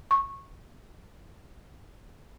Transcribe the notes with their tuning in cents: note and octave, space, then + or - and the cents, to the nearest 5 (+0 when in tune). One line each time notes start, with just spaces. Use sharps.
C#6 -15